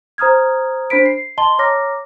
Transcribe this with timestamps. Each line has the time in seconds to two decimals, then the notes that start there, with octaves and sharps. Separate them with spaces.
0.18 C5 A#5 D#6 F6 G#6
0.90 D4 C5 B5 B6 D7
1.06 C7
1.38 D#5 A5 C6 G7
1.59 C#5 A#5 D6 F6 A#6